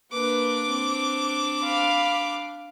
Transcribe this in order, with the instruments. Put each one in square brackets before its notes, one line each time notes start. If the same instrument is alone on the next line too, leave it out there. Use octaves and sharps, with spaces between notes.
[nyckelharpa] A#3 B4 [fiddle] D4 D6
[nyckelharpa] C4
F5 B5